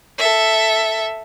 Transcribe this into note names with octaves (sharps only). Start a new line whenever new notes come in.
A4 E5